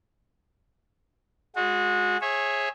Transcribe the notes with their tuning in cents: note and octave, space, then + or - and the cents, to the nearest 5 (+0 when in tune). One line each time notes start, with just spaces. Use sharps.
G#3 +0 F#4 -30
G#4 +0 C#5 -30 E5 +0